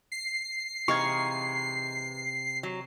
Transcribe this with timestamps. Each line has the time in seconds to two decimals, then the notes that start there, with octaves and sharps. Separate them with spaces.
0.12 C7
0.88 C3 E3 G#3 D#4 F5 C#6 G#6
2.63 F#3